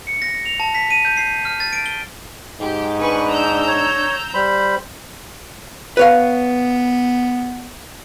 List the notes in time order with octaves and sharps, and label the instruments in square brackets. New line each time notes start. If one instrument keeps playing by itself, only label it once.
[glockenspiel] C#7
A#6
F7
A5
B6
D#7
G6
C7
F6
A6
D7
G7
[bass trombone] G#2 [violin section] G4
[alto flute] D4 [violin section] B4 G#5 C#6
[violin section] A#5 E6 G6
[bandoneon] C#5
G3 C5 B5
[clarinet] B3 [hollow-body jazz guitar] B4 C#5 F5